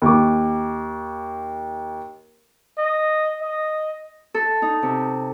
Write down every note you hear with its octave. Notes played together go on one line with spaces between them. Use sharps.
D#2 D6
D#5
D#5
A4
D#4
C3